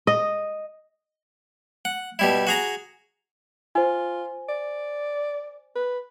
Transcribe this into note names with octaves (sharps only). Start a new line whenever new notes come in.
D#5
F#5
B2 G3 E4
F#4 G#4 A#5
F4 C5 G#5
D5
B4